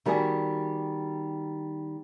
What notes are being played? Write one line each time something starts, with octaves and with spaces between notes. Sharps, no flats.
D#3 G3 B3 F#4 G#4